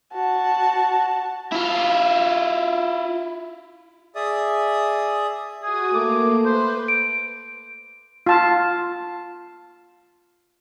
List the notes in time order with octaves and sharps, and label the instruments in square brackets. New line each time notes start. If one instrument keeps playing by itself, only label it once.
[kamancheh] F#4 A5
[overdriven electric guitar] E4 F4
[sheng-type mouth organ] G#4 D5 E5 D#6
[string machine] F#4 D#6 [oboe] G#4
[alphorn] A3 [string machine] A#3 [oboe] D6
[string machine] B4 [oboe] C5
[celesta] D7
[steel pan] F4 A5